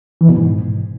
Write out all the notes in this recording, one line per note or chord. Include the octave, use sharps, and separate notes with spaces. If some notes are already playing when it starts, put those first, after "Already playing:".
E3
B2
G#2